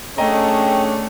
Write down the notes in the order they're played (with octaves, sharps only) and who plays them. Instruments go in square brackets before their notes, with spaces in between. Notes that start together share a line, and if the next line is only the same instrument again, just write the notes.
[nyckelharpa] A3 [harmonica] C#4 D4 G#4 [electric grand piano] D#5 A#5 [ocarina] G5